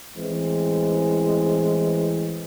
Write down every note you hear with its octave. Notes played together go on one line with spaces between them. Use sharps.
A1 E3 G#3 C4